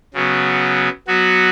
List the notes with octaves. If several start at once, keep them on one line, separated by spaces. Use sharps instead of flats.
C#3 F#3 B3
F#3 B3 F#4